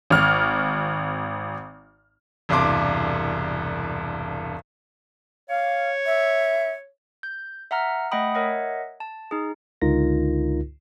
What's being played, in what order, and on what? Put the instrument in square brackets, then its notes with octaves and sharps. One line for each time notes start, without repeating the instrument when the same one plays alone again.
[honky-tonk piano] G#1 F6
[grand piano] E1 C2 G2 C6 D6
[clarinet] C#5 [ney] F5
[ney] E5
[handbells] G6
E5 F#5 A#5 F6
A3 D#5 F#5 G5 B5 D#6
A#4 C#5 D#5 E5 F#5
A5
D#4 G#4
[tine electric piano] C#2 D3 D#4 F4 A#4 A#6